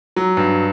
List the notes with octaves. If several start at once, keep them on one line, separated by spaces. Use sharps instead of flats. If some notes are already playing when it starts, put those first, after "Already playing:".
F#3
G2